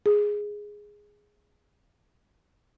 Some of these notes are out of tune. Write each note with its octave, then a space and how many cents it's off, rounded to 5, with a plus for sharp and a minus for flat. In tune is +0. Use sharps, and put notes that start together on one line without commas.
G#4 -5